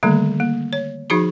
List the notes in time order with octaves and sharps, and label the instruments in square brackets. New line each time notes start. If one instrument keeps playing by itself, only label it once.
[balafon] D3 D#3 G3 A3 A#3
A#3
C#5
F3 D#4 F#4 G#4 B5